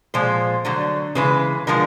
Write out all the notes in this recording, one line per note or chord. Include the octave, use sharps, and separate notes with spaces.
A#2 F3 G#3 C5
D3 F#3 A3
C#3 E3 G#3 B4
D3 F3 G#3 A#4